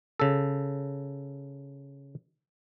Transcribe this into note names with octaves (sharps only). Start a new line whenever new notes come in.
C#3 A4